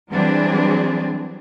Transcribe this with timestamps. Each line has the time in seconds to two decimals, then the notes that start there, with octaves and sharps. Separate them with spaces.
0.11 E3 F#3 G3 C4 D4 G#4